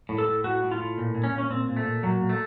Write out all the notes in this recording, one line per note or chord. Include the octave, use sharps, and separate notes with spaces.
A2
A4
A2
A2 F#4
A2
F4
A2
A#2
A#2
C#4
A#2
C#4
A#2 C4
A#2
A3
A#2
A#2 F#3
A#2
A3